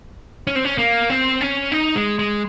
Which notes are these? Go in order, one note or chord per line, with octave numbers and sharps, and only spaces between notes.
C#4
C4
C#4
A#3
C4
C#4
D#4
G#3
G#3